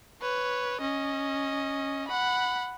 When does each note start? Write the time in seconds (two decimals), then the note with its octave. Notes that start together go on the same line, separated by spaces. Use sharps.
0.22 B4 C#5
0.81 C#4 D#5
2.08 F#5 B5